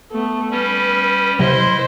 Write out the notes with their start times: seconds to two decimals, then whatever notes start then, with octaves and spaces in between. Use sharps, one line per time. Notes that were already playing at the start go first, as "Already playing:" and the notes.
0.12 A3 B3
0.51 G3 C#4 B4
1.39 C3 F#3 E4 C5 D#5